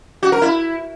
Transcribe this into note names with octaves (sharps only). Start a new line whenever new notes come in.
F#4
A#4
E4